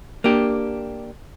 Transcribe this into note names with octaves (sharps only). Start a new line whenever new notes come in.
A#3 D4 G4